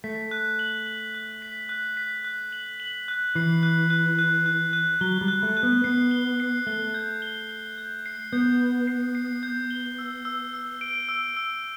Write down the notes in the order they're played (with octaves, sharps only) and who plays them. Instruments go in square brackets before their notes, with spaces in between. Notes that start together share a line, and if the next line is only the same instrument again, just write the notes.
[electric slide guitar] A3 [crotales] B6
[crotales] F#6
F#7
F#7
F#6
B6
F#6
B6
F#6
F#7
F#7
F#6
[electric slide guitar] E3 [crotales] C7
[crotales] F#6
F#6
F#6
F#6
F#6
[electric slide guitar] F#3 [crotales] G7
[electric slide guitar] G3
[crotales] F#6
[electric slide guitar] A3
[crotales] F#6
[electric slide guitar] B3
[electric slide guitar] B3 [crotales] C7
[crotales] G7
C7
[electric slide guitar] A3 [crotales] G7
[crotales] G6
G7
G7
G6
C7
[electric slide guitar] B3 [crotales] G6
[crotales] G6
C7
C7
G6
G7
E6
E6
E6
D7
E6
E6